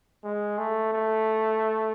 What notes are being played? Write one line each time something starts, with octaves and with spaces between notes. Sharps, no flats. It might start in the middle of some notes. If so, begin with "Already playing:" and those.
G#3
A3
A3